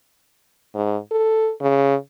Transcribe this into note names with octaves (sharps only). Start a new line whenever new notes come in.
G#2
A4
C#3